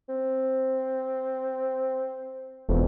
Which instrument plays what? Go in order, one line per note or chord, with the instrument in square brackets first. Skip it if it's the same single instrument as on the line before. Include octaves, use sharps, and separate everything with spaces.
[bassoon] C4
[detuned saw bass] E1 [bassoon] F2